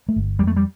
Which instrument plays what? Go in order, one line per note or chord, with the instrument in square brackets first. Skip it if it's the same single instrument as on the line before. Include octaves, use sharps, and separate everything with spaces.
[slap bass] A3
[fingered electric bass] G1
[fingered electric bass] F2 [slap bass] G3
[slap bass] A3
G3